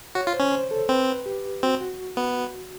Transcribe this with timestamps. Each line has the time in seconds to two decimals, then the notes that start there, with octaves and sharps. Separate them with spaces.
0.15 F#4 C#5
0.27 F4
0.34 C5
0.40 C#4
0.52 C5
0.71 A4
0.89 C4 B4
1.26 G4
1.63 C4 F#4
1.81 F#4
2.17 B3